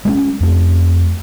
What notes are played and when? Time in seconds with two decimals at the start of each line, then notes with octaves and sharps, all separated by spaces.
0.05 G#3 A3 C#4
0.41 F2 A3